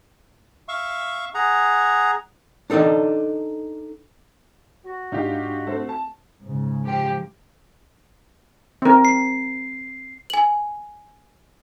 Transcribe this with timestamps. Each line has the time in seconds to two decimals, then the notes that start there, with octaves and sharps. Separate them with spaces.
0.68 E5 F5 C#6
1.35 G#4 F#5 A#5
2.70 D4 D#4 A4 D5 D#5
4.85 F#4
5.12 G#2 D4 D#4 F4 G4
5.67 A3 C4
5.89 A5
6.42 G#2 C#3
6.84 F3 G4
8.82 C4 A#4
9.05 C7
10.30 G#5 F#7